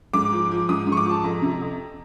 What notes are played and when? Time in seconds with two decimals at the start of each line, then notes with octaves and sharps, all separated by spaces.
0.13 G#2 D6
0.32 F3
0.51 F3
0.69 G#2 D#6
0.87 G#2
0.92 C#6
0.97 D6
1.05 F3 A5
1.24 F2 A#5
1.42 C3
1.61 F2